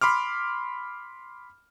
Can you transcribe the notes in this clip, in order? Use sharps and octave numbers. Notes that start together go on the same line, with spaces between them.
B5 C6 D6 F6